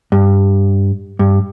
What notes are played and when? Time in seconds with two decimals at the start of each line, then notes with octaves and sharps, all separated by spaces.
0.12 G2
1.19 G2